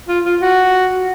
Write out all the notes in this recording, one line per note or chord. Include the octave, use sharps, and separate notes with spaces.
F4
F4
F#4